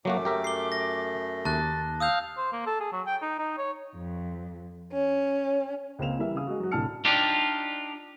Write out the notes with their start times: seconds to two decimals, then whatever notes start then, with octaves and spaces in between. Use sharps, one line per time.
0.05 F#2 F#3 A3 A#3 F#4 D6
0.25 G4 A#4 E5
0.44 C7 G7
0.72 A#6
1.45 D#2 A5 F#6 A6
2.00 F5 D#6 E6 G6
2.37 C5
2.52 A#3
2.66 A4
2.80 G#4
2.92 F#3
3.06 G5
3.22 D#4
3.39 D#4
3.58 C#5
3.95 F2
4.92 C#4
5.99 C#2 A#3 C4 F5 E7 F7
6.19 E3 G3 A#4 E5
6.35 C#3 F5 D#6
6.47 G#3 F#4
6.60 F#3 F#4
6.71 C2 A2 D3 A5 F6 C#7
7.05 D4 D#4 F4 G4